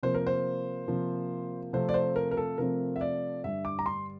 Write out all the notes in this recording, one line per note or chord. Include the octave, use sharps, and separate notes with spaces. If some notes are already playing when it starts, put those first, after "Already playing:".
C3 F3 A#3 C5
A#4
C5
C3 F3 A#3
C3 F3 A3 C4 C5
D5
C5
A#4
A#4
A4
C3 F3 A3 C4 A#4
E5
D5
G2 D3 G3 E5
D6
A#5
C6